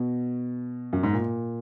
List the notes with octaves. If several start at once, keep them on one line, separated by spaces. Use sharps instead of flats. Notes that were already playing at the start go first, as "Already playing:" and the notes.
Already playing: B2
F#2
G#2
A#2